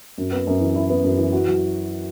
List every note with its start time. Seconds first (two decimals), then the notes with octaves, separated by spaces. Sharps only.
0.18 F#2
0.32 B3
0.47 F#2
0.60 E3
0.76 E4
0.90 B3
1.04 F#2
1.18 E3
1.32 F#4
1.47 F#3